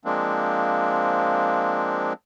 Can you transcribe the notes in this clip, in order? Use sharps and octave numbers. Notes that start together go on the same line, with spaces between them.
F3 G#3 A#3 C4 D4